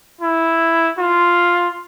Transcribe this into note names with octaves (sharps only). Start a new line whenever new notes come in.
E4
F4